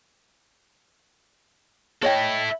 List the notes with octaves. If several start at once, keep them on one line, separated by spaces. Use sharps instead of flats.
E4 A4 C#5 D#5 G5